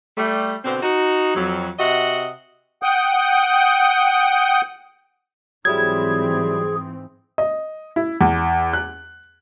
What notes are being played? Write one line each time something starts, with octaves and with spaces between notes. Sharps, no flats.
G3 A3
B2 D3 C4
D#4 F#4
F2 F#3
C3 F#4 D#5 E5 F#5
F#5 G5 D#6 G6
G#2 E3 F#3 G3 C4 E4 G#4 G#6
D#5
E4
E2
F#6